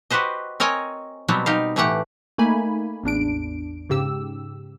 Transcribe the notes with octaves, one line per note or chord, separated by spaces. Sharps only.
F#4 G4 B4 C5 D#5
C4 A#4 C#5 D#5 G#5
B2 F#3 G3 B3 C4
D#4 G4 F5
A2 E3 A3 G4 F#5
A3 A#3 D#4 G#5 B5
A1 E2 D4 D7
G#2 C#3 G4 E6